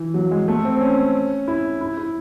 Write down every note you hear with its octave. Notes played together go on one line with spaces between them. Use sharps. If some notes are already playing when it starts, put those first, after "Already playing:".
Already playing: E3
F#3
G#3
A3
C4
C#4
E4
E4
E4